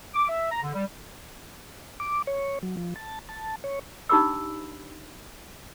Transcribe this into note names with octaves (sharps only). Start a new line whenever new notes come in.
D6
E5
A#5
D3
G3
D6
C#5
F#3
F3
A5
A5
C#5
D4 D#4 G4 B5 D6 E6